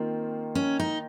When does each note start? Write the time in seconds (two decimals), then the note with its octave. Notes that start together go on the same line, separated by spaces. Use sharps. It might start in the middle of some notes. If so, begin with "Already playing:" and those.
Already playing: D#3 A#3 C4 F4
0.55 C#4
0.80 D#4